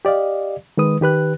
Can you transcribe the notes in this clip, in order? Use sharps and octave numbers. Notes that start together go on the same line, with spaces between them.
G4 D5 D#5 F5
D#3 G#3 B4 D#6
D#3 G4 B4 F#6